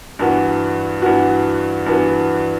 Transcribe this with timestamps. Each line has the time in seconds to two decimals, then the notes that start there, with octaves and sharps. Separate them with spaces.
0.19 G2 E3 B3 F#4
1.02 G2 E3 B3 F#4
1.86 G2 E3 B3 F#4